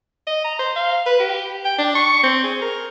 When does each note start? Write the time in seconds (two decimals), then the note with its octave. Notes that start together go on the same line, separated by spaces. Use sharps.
0.27 D#5
0.44 A#5
0.59 C5
0.76 F5
1.06 B4
1.20 G4
1.65 G5
1.78 D4
1.95 C#6
2.23 C4
2.44 G#4
2.62 A#4